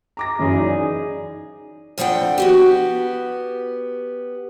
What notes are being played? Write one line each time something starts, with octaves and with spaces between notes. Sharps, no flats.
A#5 D6 A#6
F#2 E3 C#4 G#4
D#4 D5
F2 F3 D4 F#5 G5
B3 F#4 G4